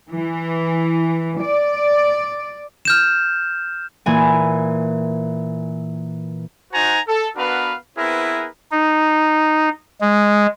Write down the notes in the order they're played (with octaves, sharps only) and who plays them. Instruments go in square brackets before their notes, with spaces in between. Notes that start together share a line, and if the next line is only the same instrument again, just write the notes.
[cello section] E3
D5
[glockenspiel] F6 G6 E7
[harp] A#2 E3 G#5
[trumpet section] D#4 F#4 C5 F#5 G#5 A#5
A4
B3 D4 F#4 A#4 B4 F5
B3 C4 E4 G#4 A#4 B4
[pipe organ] D#4
G#3